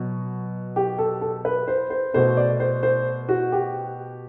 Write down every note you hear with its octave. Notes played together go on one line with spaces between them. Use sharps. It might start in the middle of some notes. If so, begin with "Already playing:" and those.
Already playing: B2 F#3
G4
A4
A4
B4
C5
C5
B2 A3 C5
D5
C5
C5
F#4
G4